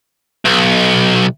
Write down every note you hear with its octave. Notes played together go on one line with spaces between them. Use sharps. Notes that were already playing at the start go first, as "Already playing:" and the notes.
B1